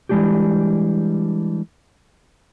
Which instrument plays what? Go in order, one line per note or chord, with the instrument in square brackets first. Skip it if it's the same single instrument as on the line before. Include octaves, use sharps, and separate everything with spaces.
[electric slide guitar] E3 G3 G#3 D4 F#4 G4